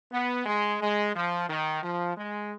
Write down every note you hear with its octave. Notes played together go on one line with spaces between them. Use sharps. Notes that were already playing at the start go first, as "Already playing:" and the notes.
B3
G#3
G#3
F3
D#3
F3
G#3